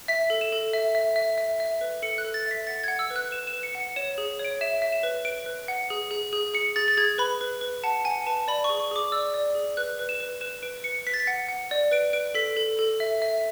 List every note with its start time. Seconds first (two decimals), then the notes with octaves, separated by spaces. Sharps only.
0.08 E5 B6
0.30 A4
0.41 E7
0.52 A4
0.73 E5
0.95 E5
1.16 E5
1.38 E5
1.60 E5
1.81 B4
2.02 A4 C#7
2.18 F#6
2.24 A4
2.34 A6
2.46 E5 B6
2.67 F#5 A6
2.84 G#6
2.88 F#5
2.99 E6
3.10 B4
3.16 F#6
3.31 B4 E7
3.47 E7
3.53 B4
3.63 C#7
3.75 F#5
3.80 C#7
3.96 C#5 E7
4.18 G#4
4.39 C#5
4.45 D7
4.61 E5 E7
4.82 E5
4.92 E7
5.03 B4
5.25 B4 D7
5.46 B4
5.68 F#5
5.90 G#4
6.11 G#4
6.33 G#4
6.54 G#4 C#7
6.76 G#4 A6
6.88 A6
6.97 G#4 G#6
7.18 B4 B5
7.41 B4
7.61 B4
7.83 F#5 A5
8.05 F#5 G#5
8.27 B4 A5
8.48 D5 B5
8.64 C#6
8.69 G#4
8.80 C#6
8.91 G#4 D6
9.12 D5 E6
9.34 D5
9.55 G#4
9.77 B4 F#6
9.99 B4
10.09 E7
10.20 B4
10.41 B4 E7
10.62 B4 D7
10.84 B4 C#7
11.06 B4 B6
11.14 A6
11.20 B6
11.27 F#5
11.49 F#5
11.71 D5
11.92 B4 D7
12.13 B4 D7
12.35 A4 B6
12.57 A4
12.79 A4
13.00 E5
13.22 E5